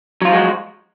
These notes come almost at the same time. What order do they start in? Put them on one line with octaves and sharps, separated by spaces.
F#3 F4 F3 G#3 F#4